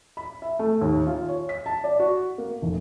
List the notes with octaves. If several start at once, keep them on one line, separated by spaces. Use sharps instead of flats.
B5
E5
A3
D#2
F4
C#5
B6
A5
D5
F#4
A#3
F1